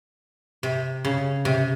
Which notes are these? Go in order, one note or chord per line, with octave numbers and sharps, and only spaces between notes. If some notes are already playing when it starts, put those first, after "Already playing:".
C3
C#3
C3